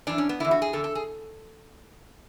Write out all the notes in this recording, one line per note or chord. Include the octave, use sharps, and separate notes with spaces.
F#2 E3 D4
C#4
B3
E2 D3 E4
F#4
G#4
E2 D3 A4
A4
G#4